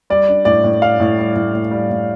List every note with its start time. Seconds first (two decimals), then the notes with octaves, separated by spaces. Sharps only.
0.10 G3 D5
0.28 D4
0.45 A2 D5
0.64 A2
0.82 G3 F5
1.00 A2
1.18 G3
1.36 A2
1.54 A2
1.71 G3
1.89 A2